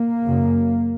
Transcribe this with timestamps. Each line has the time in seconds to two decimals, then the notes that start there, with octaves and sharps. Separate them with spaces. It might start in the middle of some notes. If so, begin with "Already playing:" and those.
Already playing: A#3
0.27 F#2 C#3